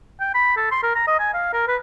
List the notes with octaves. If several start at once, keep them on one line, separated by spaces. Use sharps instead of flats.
G5
B5
A4
C6
A#4
A#5
D#5
G#5
F5
A#4
B4